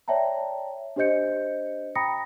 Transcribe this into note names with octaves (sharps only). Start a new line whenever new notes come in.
C#5 D5 E5 G5 A5 A#5
D4 G4 C5 D#5 G6 C#7
G5 A#5 B5 D#6 A#6 C#7